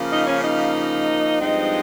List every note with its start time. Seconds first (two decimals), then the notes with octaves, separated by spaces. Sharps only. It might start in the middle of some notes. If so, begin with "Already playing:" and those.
Already playing: C#3 F3 A#3
0.10 D#4 D#5
0.26 C#4 C#5
0.42 D#4 D#5
1.40 G2 F3 G#3 C4 D#4